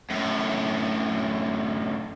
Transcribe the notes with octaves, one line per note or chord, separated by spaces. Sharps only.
F#2 A2